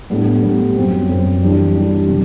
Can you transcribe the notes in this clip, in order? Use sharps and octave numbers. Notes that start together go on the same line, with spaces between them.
A2 G3 B3 D4
A2 G3 B3 D4
F#2 F#3 C4
F#2 F#3 C4
E3 G3 D4
E3 G3 D4
C3 F#3